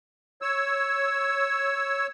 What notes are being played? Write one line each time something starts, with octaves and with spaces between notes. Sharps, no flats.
C#5 E6